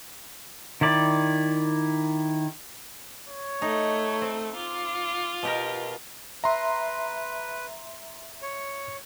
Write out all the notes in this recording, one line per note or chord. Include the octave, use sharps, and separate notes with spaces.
D#3 E4 D5
C#5
A3 D#4
C4
F4 D6
B2 G4 A#4
B4 E5 A#5 C6
C#5